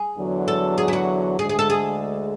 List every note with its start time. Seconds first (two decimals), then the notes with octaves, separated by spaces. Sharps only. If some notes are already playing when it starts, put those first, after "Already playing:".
Already playing: G#4
0.17 E2 D3 F#3
0.48 A4
0.78 G#4
0.88 E4
0.93 F#4
1.39 D2 D3 G#3 G#4
1.49 G#4
1.59 A4
1.70 G#4